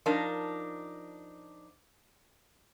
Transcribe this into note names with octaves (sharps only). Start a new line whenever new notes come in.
F3 D4 D#4 A#4